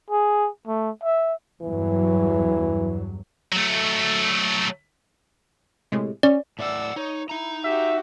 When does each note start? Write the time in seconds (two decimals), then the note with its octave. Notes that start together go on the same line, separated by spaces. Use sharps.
0.11 G#4
0.67 A3
1.03 E5
1.62 E2 G2 E3 F#3
3.52 F#3 A3
5.92 A2 C3 G#3
6.23 C#4 D5
6.59 A2 D5 E5 F#5 E6
6.96 D#4 C#5
7.30 D#4 E4 A#5
7.64 F#4 G4 E5